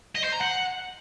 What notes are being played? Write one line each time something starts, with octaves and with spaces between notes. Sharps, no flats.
D#5
C5
A#5
F#5